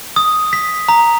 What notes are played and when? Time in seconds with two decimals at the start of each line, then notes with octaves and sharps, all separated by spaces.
0.16 D#6
0.53 B6
0.89 A#5